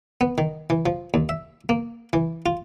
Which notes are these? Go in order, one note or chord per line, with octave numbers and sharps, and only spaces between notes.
B3
D#3
E3
F3
D#2
E5
A#3
E3
F4